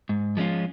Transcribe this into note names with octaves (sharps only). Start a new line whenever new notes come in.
G#2
F3 G#3 C#4 F4